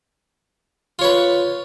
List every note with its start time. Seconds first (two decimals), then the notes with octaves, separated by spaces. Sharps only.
0.99 F4
1.01 C#5
1.04 B4